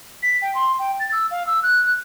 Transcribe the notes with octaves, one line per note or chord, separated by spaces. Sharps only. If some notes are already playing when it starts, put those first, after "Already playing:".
B6
G5
C6
G5
A6
E6
F5
E6
F#6